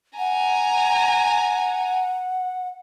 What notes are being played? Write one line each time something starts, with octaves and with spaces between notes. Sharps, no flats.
F#5 G#5 A#5